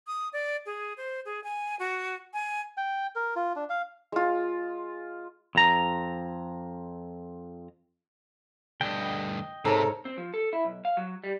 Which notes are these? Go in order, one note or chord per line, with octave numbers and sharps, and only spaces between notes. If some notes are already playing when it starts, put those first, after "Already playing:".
D#6
D5
G#4
C5
G#4
G#5
F#4
G#5
G5
A#4
F4
D4
F5
G#3 F4
F2 A#5
D2 G2 D#5 G5
G#2 C3 A4 A#4 C#5
C4
F3
A4
E4
B1
F5
F#3
G3